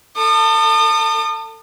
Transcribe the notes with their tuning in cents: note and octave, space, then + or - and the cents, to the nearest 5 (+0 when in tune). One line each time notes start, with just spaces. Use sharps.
A4 +30 D#6 -35